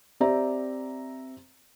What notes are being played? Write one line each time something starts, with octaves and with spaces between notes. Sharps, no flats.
C4 G4 C5 D5 E5 A#5